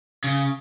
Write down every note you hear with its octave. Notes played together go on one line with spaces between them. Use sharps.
C#3